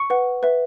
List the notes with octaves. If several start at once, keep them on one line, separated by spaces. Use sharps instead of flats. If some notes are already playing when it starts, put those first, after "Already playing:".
Already playing: C#6 C#7
B4 F#5
B4 E5